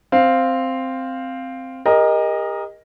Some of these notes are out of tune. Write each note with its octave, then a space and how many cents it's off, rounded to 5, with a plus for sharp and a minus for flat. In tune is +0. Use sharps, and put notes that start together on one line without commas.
C4 +0 F5 +0
G4 +45 A#4 +10 D#5 +0